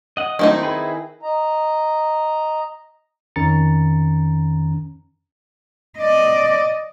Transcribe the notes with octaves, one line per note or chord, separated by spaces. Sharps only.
D#5 F#5
D#3 F#3 A3 C4 D#4 E4
E4 G#4 B4
D#5 A#5
F2 D#3 C#4 A#5 A6 C#7
D5 D#5